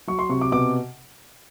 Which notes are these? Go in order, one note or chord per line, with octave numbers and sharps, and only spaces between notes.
F#3 C#6
C6
C3 C#6
D6
B2 D6